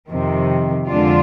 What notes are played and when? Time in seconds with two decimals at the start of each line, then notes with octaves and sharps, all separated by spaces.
0.10 F2 C3 D#3
0.87 F2 D3 G#3 D4 F4